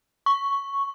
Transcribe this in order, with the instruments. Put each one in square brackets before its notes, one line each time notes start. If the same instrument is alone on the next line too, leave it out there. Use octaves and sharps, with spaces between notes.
[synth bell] C#6